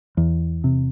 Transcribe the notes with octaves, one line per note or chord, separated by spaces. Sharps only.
E2
C3